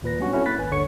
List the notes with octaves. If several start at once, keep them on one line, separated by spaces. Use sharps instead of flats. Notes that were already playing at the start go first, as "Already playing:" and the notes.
D#2 A#2 B4 A#6
F#3 G3 B3 C#4 D4 F#4
C4 C#4 E4 F#4 A4
A#3 B5 F#6 A6 B6
G#1 B4 G#5
G1 D#2 D3 C#5 C#6 C#7